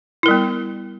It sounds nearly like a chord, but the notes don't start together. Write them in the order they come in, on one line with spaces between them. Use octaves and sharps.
E4 A#4 G3 B3